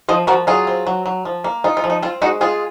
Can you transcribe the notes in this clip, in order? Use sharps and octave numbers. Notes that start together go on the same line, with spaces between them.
F3 C5 D#5
F3 F#4 A#4
F#3 F4 G#4
C4
F#3
F#3
F3
A#3
D#4 F4
F4
F3
D#4
C4 F4
G#3 D#4 F#4
G#3 F4 G#4